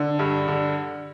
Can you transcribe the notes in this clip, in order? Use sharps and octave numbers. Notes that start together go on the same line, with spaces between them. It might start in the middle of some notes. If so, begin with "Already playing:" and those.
Already playing: D3
G2
D3